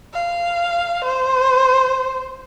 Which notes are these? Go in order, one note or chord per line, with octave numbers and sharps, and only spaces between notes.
F5
C5